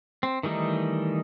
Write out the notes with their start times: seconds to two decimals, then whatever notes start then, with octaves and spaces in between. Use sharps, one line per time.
0.23 C4
0.43 D#3 E3 G3 A3 D#4